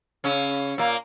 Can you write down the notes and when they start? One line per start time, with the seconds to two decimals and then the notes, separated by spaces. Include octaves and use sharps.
0.24 C#3 C#4
0.78 A#2 A#3